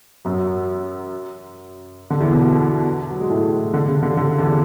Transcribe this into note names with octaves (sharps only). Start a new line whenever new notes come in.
F#2 F#3
D3
E2 E3
B2 B3
F#3
G#3
A2 A3
D3
C#3
D3
D3
E2 E3